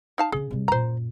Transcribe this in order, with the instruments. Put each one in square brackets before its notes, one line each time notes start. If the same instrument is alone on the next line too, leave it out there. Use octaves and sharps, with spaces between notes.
[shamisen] D#4 F5 A5
[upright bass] C#3 C#4 [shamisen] G#4
[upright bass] C3 G3
[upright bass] F#2 A#2 [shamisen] C5 A#5